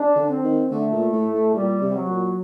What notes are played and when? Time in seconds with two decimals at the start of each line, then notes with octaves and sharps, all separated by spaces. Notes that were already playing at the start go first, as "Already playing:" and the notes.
Already playing: D4
0.16 D3
0.29 C4
0.44 D#3
0.70 D3 A3
0.91 A#2
1.12 A2
1.33 A2
1.54 A#2 G3
1.82 C3
1.95 F#3
2.09 A#2